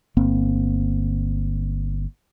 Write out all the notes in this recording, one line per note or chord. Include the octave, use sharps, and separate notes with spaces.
G1 A#3 C4